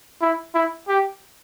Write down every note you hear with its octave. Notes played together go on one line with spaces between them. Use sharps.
E4
E4
G4